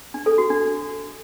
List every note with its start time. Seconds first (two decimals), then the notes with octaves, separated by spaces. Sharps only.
0.14 D4
0.26 A4
0.38 F#4
0.50 D4